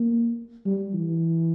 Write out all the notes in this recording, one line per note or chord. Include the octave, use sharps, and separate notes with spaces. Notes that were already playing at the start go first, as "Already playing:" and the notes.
Already playing: A#3
G3
E3